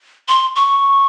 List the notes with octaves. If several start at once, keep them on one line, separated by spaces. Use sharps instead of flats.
C6
C#6